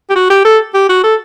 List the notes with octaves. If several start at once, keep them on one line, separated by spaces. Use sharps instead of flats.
G4
F#4
G4
A4
G4
F#4
A4